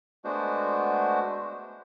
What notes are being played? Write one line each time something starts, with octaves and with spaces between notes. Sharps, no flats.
G#3 A3 B3 D4 F#4 C5